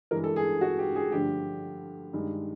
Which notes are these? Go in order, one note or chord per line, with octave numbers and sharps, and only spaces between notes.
G2 E3 G#3 A#4
A4
G#4
F#4
G4
G#4
G2 D3 F3 A3 G4
G2 D#3 G#3